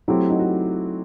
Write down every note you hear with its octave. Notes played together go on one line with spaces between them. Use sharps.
F#3 A3 C4 E4 G4
D#4 F#4
F#4